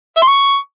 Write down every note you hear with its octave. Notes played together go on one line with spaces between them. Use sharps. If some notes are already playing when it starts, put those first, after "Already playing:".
E5
C6
C#6